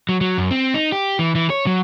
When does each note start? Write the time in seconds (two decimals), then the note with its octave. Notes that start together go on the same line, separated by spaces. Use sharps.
0.09 F#3
0.21 F#3
0.38 F#2
0.51 C4
0.74 D#4
0.92 G4
1.19 E3
1.35 E3
1.50 C#5
1.67 F#3